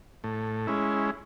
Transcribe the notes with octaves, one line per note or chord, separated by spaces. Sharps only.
A2
G#3 C#4 E4